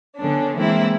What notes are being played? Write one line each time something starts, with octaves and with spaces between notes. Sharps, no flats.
D3 B3 C#4 D4
E3 G#3 A#3 C4 E4